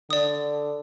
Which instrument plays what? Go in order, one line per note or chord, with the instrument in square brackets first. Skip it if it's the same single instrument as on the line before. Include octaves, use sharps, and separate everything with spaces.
[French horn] D3 [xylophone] D5 D#6